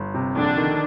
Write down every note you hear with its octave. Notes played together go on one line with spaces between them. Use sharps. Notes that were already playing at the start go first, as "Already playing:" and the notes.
Already playing: G1
C3
A#1 D3 D4
D#3